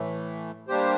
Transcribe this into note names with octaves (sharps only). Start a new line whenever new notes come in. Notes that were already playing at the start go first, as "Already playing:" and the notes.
Already playing: A2 E3 A3
G3 A#3 D4 G4 C5